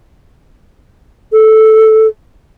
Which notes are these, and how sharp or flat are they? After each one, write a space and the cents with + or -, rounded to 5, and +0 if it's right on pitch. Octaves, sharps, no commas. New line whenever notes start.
A4 -5